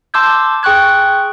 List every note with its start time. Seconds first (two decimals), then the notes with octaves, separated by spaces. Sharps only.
0.14 A5 C6 D6 E6 G6 G#6
0.63 G#4 G5 C#6 F#6 G#6